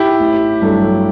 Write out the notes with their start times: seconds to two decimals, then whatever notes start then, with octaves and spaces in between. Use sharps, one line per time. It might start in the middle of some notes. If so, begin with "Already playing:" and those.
Already playing: E4 G4
0.20 A1
0.62 G2 F#3 A3 D4